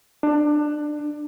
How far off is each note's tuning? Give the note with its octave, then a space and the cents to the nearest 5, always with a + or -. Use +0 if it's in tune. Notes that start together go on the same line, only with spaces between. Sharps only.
D4 +20